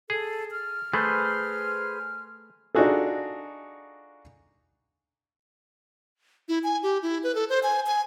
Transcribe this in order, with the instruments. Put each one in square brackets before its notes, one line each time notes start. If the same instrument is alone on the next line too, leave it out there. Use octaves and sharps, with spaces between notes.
[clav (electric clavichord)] G#4 [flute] A4
[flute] F6
[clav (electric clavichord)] A3 [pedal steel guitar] G#4 B4 C5
[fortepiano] D4 D#4 F4 F#4 G#4 A4
[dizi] E4
G#5
G4
E4
B4
A4
C5
G#5
G#5